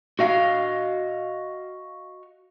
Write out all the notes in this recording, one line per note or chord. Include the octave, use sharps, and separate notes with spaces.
F#4 D#5 F5